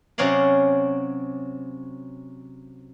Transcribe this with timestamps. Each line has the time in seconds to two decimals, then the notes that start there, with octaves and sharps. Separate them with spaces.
0.18 C3 F#3 C#4 G#4 D5 F5